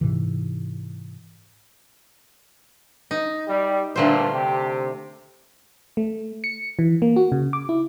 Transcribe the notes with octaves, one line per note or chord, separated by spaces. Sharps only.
G#2 C3 E3
D#4
G3
G2 A#2 D3 A3 C5
C3 G4
A3
C#7
E3
A#3
F#4
C#3
D6
E4